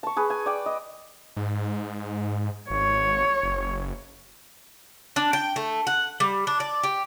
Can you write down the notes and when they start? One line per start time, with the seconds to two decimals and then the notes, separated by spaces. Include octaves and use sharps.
0.03 A5 C#6
0.17 G#4 B4
0.30 G#5
0.46 D5 G5
0.66 D#5
1.37 G#2
2.70 G#1 C#5
3.43 F#1
5.16 D4
5.33 G5
5.56 A3
5.87 F#5
6.20 G3
6.47 D4
6.60 D5
6.83 G4